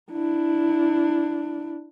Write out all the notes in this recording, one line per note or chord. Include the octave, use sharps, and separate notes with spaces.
D4 E4